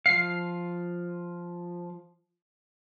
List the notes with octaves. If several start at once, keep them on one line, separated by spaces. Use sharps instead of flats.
F3 F5 C7